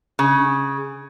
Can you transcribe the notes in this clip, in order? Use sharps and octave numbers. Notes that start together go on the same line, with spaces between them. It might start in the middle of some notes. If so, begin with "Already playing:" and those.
C#3